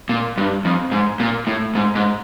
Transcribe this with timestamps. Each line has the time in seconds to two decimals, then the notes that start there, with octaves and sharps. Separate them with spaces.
0.09 A#2
0.37 G2
0.65 F2
0.91 G#2
1.20 A#2
1.47 A2
1.75 G#2
1.95 G#2